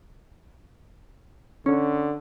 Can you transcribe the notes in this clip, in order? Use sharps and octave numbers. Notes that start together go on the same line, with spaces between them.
D3 C#4